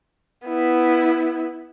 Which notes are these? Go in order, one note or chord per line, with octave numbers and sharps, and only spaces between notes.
B3 E4